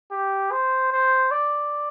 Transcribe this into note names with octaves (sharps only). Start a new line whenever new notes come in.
G4
C5
C5
D5